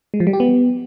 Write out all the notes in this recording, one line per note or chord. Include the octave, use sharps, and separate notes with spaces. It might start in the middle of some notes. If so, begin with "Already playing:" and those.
G#3
F3
G3
G4
B3